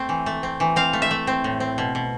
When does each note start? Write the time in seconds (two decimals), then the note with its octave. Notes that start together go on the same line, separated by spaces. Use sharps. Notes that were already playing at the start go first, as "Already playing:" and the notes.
Already playing: A3 C4
0.09 E3
0.26 A3
0.43 C4
0.60 E3
0.76 C4 F5
0.93 A3
1.02 E5
1.11 A3
1.27 C4
1.44 A2
1.60 C4
1.78 B2
1.95 B2